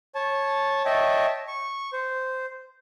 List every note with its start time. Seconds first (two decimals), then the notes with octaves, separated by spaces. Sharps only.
0.15 C#5 A5
0.85 C#5 D#5 E5 G5 A5
1.48 C#6
1.93 C5